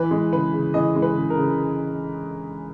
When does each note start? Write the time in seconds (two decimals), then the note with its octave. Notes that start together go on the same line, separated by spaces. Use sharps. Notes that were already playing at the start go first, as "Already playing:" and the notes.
Already playing: E3 B4
0.11 G#3
0.33 C#3 B4
0.53 C#3
0.74 E3 D#5
0.96 G#3
1.02 B4
1.17 C#3
1.30 A#4
1.37 C#3